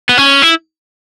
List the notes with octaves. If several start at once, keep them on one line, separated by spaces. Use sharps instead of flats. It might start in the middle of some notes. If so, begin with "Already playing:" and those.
B3
C#4
E4